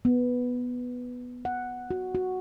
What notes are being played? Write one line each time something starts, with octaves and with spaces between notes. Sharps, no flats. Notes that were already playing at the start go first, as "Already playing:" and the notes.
B3
F#5
F#4
F#4